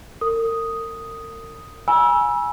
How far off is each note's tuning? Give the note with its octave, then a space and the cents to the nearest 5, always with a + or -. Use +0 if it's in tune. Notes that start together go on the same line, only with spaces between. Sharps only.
A#4 -40 D#6 +0
G#5 +0 B5 -40 E6 +0